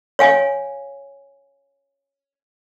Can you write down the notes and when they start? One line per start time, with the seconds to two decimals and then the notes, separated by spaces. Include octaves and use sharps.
0.19 C#5 F5 G#5